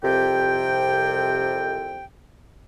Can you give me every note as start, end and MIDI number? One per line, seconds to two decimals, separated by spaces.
0.03 2.05 36
0.03 2.05 41
0.03 2.05 48
0.03 2.05 79